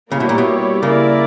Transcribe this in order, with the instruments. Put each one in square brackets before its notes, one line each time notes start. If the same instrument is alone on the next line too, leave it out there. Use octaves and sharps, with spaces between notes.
[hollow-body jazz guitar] C#3 [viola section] G3 A#3 E4 G4 C#5
[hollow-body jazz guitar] B2
A#2
B2
[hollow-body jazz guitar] C#3 [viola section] A#3 E4 A#4 D5